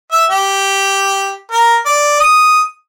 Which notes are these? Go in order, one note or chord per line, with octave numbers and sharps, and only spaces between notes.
E5
G4
A#4
D5
D#6